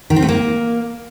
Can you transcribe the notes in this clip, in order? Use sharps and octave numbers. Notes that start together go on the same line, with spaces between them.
D#3
C4
A3
A#3